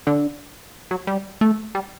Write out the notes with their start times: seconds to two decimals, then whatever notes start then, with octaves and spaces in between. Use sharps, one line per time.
0.07 D3
0.91 F#3
1.07 G3
1.41 A3
1.75 G3